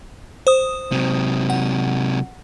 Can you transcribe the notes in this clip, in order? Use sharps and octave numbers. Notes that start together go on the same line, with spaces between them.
C5 D#6
C3 F#3
F#5